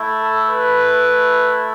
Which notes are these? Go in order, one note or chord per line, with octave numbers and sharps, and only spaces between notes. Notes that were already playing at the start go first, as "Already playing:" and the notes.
Already playing: A3 E4
A4
B4